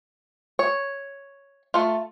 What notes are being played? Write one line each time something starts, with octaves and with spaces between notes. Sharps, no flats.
C#5
A3 F4